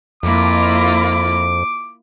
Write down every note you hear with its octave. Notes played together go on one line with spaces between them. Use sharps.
F2 A#3 E4 F4 D6